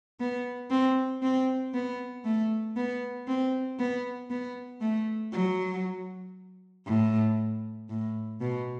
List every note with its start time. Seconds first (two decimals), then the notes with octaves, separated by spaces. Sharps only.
0.20 B3
0.71 C4
1.22 C4
1.74 B3
2.25 A3
2.76 B3
3.28 C4
3.79 B3
4.30 B3
4.81 A3
5.33 F#3
6.87 A2
7.90 A2
8.41 B2